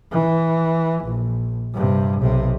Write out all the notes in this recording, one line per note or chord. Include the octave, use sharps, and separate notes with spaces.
E3
A#1
G2 C3
B1 C3